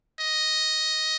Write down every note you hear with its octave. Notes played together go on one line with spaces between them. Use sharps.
D#5